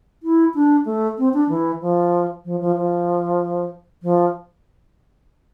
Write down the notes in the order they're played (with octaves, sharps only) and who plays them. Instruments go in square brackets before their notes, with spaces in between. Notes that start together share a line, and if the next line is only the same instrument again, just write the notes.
[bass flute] E4
D4
A3
C4
D4
E3
F3
F3
F3
F3
F3